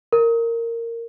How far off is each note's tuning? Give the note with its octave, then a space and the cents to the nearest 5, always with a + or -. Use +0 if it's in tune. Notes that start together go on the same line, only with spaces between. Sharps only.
A#4 -15